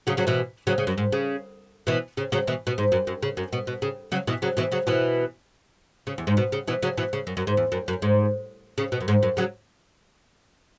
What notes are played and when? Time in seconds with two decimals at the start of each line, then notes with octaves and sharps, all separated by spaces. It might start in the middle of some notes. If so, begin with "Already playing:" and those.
0.07 C#3 F#3
0.17 C#3 F#3
0.27 B2 E3
0.67 C#3 F#3
0.78 C#3
0.87 F#2
0.98 G#2
1.12 C#3
1.87 B2 E3
2.17 C#3
2.32 C#3 F#3
2.47 B2 E3
2.67 B2
2.78 G#2
2.92 F#2
3.07 F#2
3.23 C#3
3.37 F#2
3.53 B2
3.67 B2
3.82 C#3
4.12 C#3 F#3
4.27 B2 E3
4.42 C#3 F#3
4.57 B2 E3
4.72 C#3 F#3
4.87 B2 E3
6.07 C#3
6.18 E2
6.27 G#2
6.37 B2
6.52 C#3
6.68 B2 E3
6.82 C#3 F#3
6.98 B2 E3
7.13 C#3
7.27 F#2
7.37 F#2
7.47 G#2
7.57 E2
7.72 F#2
7.88 F#2
8.02 G#2
8.78 C#3
8.92 B2
9.01 F#2
9.08 G#2
9.23 F#2
9.37 C#3 F#3